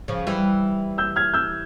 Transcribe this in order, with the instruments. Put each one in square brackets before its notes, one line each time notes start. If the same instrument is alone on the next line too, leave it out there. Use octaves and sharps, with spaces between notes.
[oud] C#3 F3
E3 G3
[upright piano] E6 G6
F6 G#6
E6 G6